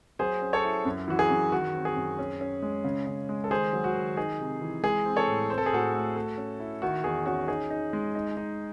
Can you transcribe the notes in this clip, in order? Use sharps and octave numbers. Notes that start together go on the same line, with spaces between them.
F#3 G#4 C5
C#4
A4 C#5
E4
F#2
E3 F#4
G#4
F#2
D#3 F#4
C4
G#4
F#2
C#4
C#4
G#3
C#3
C#3
G#3
A4
D#3 G#4 C5
F#3
F#4
D#3
D#4 G#4
C3
E3
G#3 G#4
C4
A4 C#5
A2
C4 C5
A4
G#4
A2 F#4 A4
A3
A3
C#4
E4
D#3 F#4
E2 G#4
C#4 F#4
D#4 G#4
D#4
G#3
D#4
D#4